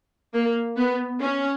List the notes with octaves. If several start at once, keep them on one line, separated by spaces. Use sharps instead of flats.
A#3
B3
C#4